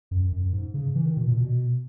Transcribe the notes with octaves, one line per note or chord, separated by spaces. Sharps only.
F#2
F#2
G#2
C#3
E3
D#3
B2
A#2
B2